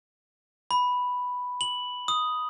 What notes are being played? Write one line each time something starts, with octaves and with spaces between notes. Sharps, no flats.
B5
F#7
D#6